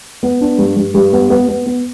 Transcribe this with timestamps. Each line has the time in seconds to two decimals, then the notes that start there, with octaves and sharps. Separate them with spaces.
0.23 B3
0.41 D4
0.58 G2
0.77 G2
0.94 G2
1.13 B3
1.30 B3
1.49 B3
1.66 B3